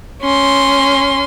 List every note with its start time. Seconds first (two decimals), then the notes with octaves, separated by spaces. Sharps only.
0.22 C#4 C6